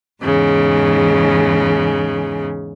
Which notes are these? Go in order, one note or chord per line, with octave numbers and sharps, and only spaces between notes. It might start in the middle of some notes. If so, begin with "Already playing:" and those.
E2 G#2 C#3